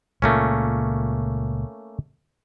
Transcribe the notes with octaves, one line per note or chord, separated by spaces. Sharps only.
C#2 A#2 C#3 A3 A#3 C#4